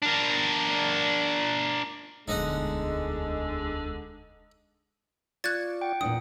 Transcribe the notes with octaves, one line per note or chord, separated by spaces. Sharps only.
D4 A#4
E1 D2 D3 G#3 D#4 D#5 F#5
F4 D5 C#6 F#6 G#6 A6
F#5 G5
E2 A#2 D4 D#6